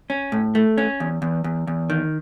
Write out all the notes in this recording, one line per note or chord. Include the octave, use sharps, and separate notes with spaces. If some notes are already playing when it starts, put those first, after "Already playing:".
C#4
A2
A3
C#4
E2
E2
E2
E2
D#3